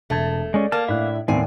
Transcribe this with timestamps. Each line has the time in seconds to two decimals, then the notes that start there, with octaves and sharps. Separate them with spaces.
0.10 E1 A3 A5 G#6
0.54 G#3 C#4 D5
0.72 A#3 A5 F6
0.88 A2 D4 E4 E5 F#6
1.28 D#2 A2 B3 C4 D5 G#5